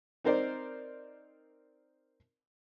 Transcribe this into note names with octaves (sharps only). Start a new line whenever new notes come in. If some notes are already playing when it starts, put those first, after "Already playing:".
C4 D#4 A#4 C5 D5